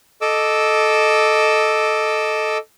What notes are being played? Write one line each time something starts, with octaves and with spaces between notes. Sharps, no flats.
A4 D#5 D6 E6